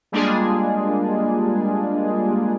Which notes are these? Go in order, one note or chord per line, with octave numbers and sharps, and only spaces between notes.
G3 G#3 A#3 D4 F4 G#4